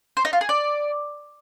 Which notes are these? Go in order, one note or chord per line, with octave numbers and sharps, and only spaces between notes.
C5
D#4
F4
G#4
D5